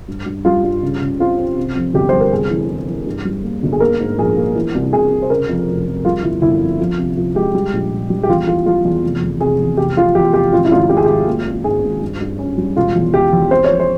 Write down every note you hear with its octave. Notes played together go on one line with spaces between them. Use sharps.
G2
G2
G3 F4
G2
C#3
C#3
C4 F4
C4
C3
F2
G1 G4
G3 C5
A#4
C3 G#4
E3
E3
E3
G2
G3
A#3
G1
G#4
A#3 A#4
G#2
A#1 G#4
A#3
E3
C2
C2 G#4
C3
C5
C#3 A#4
F2
F1
F2
G3 F4
G1 E4
G1 E4
F2
F3
C3
F3
G#3 G4
G3
A#1
A#2
G3
G4
E2 F4
E3 F4
G3 F4
E2
F1
E2
C3 G#4
E2
F1 G4
F1 F4
E2 G4
F1 G4
G#1 F4
E4
G#1 F4
G#1 G4
G#4
G#1 G4
A#3
A#3
G#2 G#4
G#1
G2
G2
C#4
G3
E1 F4
E2
E1 G4
E2
C4 C5
C#5
F3
C5